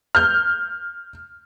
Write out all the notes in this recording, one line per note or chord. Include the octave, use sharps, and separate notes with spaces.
F6 G6